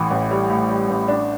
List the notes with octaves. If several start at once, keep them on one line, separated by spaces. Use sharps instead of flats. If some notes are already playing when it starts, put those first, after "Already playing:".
Already playing: A1 A2 E3
A1
G3
A2
G3
A1
D4